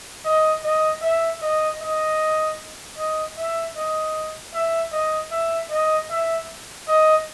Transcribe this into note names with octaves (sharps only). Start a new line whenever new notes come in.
D#5
D#5
E5
D#5
D#5
D#5
E5
D#5
E5
D#5
E5
D#5
E5
D#5